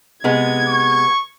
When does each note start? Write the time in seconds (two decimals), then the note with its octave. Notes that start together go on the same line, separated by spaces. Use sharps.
0.24 C3 G#3 B3 G#6
0.68 C#6